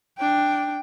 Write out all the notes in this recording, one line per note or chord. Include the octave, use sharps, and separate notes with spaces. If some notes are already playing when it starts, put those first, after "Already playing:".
D4 G5